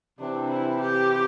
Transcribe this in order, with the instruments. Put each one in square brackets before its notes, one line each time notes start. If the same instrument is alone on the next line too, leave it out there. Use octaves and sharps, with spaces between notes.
[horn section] C3 E3 C4 [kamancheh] D4
[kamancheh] E4
G4